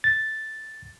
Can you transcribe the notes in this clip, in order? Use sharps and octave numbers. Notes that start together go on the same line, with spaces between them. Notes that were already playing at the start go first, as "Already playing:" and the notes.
A6